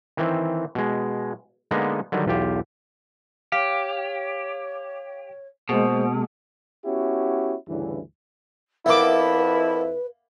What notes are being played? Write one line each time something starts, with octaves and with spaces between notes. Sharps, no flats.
D#3 E3 C4
B2 G#3
D3 G#3 A#3 B3 D#4
D3 D#3 F#3 G3
B1 E2 F4 G4
G4 C#5 F5
B2 G#3 A#3 G#4 C5
B3 C#4 E4 F#4 G4
D2 G2 C#3 E3
F2 A#3 B3 E4 B4 E5 D6